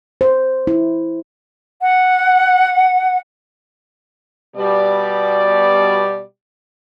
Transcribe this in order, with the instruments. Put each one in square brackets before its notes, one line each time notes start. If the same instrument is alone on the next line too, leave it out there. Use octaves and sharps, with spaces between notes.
[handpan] C5
E4
[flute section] F#5
[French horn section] B2 G3 D5